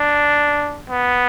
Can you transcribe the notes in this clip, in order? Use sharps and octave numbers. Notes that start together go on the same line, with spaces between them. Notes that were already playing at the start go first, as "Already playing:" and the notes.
Already playing: D4
B3